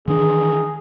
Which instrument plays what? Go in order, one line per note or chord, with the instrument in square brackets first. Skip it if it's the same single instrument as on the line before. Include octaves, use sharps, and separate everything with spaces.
[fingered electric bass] D#3 E3 D4 [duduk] G#4